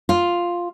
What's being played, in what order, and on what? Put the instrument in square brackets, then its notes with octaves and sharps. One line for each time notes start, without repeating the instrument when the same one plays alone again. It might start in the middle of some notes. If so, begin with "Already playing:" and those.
[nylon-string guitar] F4